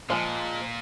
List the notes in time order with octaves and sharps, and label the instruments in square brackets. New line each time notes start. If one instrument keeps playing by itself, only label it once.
[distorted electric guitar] A#2 [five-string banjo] F3 G#3